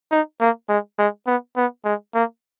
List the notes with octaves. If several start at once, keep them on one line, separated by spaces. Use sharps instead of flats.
D#4
A#3
G#3
G#3
B3
B3
G#3
A#3